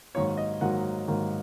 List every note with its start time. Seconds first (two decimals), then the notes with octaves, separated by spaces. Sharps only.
0.15 G#2 D#3 F#3 A#3 C#5
0.37 D#5
0.61 G#2 D#3 F#3 A#3 F#5
1.08 G#2 D#3 F#3 A#3